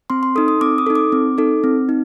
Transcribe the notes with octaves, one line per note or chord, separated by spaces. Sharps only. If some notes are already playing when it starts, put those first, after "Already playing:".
C4 C6
C6
D#4 A4 D#6
D#6
C4 D6
D#6
D#4 A4
D6
C4
D#4 A4
C4
D#4